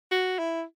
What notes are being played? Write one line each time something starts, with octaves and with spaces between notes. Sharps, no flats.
F#4
E4